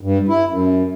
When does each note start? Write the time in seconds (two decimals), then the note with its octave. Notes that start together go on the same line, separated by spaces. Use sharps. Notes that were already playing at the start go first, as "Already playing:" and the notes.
0.01 G2
0.29 E4
0.48 F#2